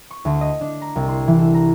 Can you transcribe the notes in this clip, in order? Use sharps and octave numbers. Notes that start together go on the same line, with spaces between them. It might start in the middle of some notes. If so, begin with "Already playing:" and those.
C#6
D2
D#5
D4
A#5
C2
C6
E3
A4
A#5